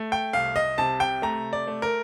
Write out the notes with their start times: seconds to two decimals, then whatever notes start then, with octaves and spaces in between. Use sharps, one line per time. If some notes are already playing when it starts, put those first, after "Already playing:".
Already playing: A3
0.12 G5
0.33 C2 F5
0.56 D#5
0.78 C3 A5
1.00 G5
1.22 A3 A#5
1.53 D5
1.67 A3
1.82 A#4